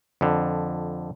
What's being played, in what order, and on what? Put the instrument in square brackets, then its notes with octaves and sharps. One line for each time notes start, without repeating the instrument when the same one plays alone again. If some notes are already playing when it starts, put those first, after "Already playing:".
[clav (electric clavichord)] F2 D3